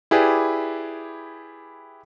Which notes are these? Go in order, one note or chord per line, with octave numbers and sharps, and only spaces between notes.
E4 G4 G#4 B4 D5